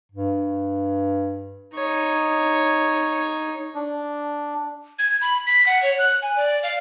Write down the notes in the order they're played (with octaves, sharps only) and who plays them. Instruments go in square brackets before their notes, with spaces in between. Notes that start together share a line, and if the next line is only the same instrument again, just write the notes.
[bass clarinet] G2
[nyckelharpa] D#4 C#5
[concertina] D4
[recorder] G#6
B5
B6
F#5
C#5
F#6
G#5
D5
F5